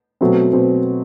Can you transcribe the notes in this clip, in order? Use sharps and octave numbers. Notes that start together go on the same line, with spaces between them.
B2 F#3 A3 C4
B2 C4